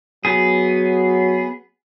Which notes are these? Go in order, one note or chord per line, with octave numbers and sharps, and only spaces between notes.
F#3 B3 G#4